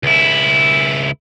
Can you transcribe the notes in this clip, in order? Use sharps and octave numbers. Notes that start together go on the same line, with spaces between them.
C#2 E4